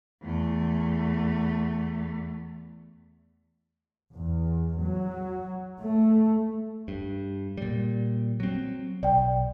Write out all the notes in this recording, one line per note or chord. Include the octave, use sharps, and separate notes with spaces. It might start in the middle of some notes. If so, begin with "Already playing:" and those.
E2 A3
E2
F#3
A3
G2
A#2 G3
F#3 C4
B1 D5 G5